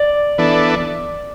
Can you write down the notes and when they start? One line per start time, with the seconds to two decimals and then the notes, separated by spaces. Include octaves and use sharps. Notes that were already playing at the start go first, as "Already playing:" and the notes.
Already playing: D5
0.38 E3 B3 D4 A4